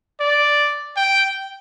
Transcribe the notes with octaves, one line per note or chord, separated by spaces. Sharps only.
D5
G5